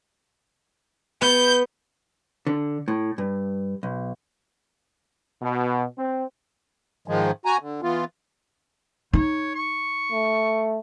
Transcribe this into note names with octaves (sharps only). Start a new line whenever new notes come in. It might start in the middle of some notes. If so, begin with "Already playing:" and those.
B3 G6
D3
A2
G2
B1
B2
C4
G#2 D#3 F3 G#3
F#4 G#5 A#5
D3
E3 B3 F4
D#4 C#5
C#6
A3